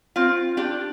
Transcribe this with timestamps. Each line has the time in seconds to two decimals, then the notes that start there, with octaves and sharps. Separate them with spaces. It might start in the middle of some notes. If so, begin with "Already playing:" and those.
0.16 C4 F4
0.57 D4 G4